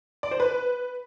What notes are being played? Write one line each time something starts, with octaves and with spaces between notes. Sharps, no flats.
D5
C5
B4